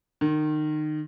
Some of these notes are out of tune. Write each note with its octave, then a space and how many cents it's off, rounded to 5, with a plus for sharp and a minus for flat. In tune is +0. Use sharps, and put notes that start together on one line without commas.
D#3 -30